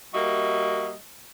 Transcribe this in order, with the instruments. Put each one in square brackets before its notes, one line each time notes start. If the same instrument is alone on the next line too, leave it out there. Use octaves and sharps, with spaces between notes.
[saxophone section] G3 A#3 F#4 D#5 E5